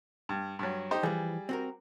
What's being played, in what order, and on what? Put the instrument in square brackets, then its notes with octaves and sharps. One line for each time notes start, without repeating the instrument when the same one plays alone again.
[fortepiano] G2
G2 F#3
D#4 G4 C5
[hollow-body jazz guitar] E3 F3 [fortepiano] G3 G#4
[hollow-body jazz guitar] C4 F#4 A#4